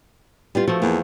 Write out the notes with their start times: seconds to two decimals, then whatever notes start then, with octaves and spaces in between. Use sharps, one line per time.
0.55 G3 B3 F4
0.68 F3 A3 F#4
0.82 E2 A#3